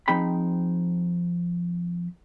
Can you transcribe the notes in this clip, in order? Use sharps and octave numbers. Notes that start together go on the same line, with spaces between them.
F3 C4 D#4 G#4 G5 B5